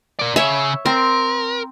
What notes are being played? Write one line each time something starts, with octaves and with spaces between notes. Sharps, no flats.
A#4 D5
C#3 C#5 E5
C4 A#4